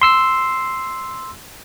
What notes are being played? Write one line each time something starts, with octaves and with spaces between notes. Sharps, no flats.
C6 E6 C7